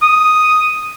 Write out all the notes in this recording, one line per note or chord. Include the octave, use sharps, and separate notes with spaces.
D#6